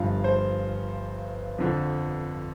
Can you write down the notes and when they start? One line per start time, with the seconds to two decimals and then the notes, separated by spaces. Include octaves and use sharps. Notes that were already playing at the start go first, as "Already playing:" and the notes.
Already playing: G1 G2 F3 F5
0.24 C5
1.58 F2 D3 F3